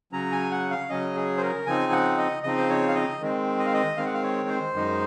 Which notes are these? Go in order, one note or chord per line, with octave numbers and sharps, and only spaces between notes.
C#3 F#3 C#4 A#5
G#5
F#5
F5
C#3 F#3 C#4 D#5
G#4
C5
A#4
C#3 F3 C4 D#4 G#5
F#5
D#5
C#3 F3 C4 D#4 D#5
C5
C#5
F5
D#5
D#3 G#3 C4
D#5
F5
D#5
D#3 G#3 C4 F5
F#5
F5
C#5
C5
F#2 D#3 G#3 D#4